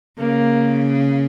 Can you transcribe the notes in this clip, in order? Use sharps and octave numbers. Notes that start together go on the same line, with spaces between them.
C#3 A#3